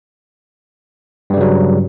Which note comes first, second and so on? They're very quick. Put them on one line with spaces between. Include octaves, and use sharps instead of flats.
G2 G3 C#3 F#3